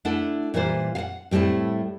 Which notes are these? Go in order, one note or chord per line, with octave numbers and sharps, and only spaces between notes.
A3 D4 E4 A4 F#5
A#2 E3 G3 F4 C5
F5 F#5
A2 G3 A3 C4 E4